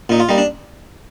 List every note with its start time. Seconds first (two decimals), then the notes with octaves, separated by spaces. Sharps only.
0.09 A#2 D#4
0.20 F4
0.29 G3 A#3 D#4
0.38 D4